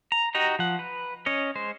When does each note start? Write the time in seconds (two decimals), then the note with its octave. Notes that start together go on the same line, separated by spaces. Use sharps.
0.12 A#5
0.35 D#4 F#4 G4 D#5 A#5
0.59 F3 F#5
0.79 B4
1.26 C#4 C#5 D#5
1.56 G#3 C5